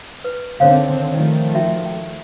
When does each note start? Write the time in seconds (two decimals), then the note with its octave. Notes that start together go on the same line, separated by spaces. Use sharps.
0.24 B4
0.60 D3 D#3 C4 C5 C#5 F5
1.13 D#3 F3 A3 D5
1.54 F#4 E5 G5
1.86 G5